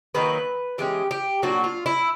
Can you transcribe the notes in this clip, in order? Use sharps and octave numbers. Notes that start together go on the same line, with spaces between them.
D#3 F#3 A#3 D#4 B4
E3 G#3 C#4 G4
G4
A#2 F#3 A#3 D4 F#4
F4
E4